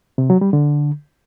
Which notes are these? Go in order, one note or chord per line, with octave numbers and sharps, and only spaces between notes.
C3
F#3
G3
D3